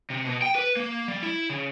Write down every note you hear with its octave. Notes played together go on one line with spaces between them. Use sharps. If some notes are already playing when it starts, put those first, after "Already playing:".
C3
B2
G5
B4
A#3
G3
E4
C#3